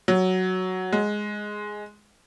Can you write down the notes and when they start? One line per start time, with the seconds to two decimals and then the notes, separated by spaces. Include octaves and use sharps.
0.08 F#3
0.93 G#3